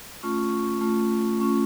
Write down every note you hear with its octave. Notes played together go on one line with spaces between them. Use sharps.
A3 C#4 F4 C#6
A3 C#4 F4
A3 C#4 F4 C#6